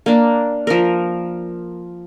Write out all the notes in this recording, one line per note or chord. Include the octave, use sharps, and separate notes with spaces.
A#3 D4
F3 A#4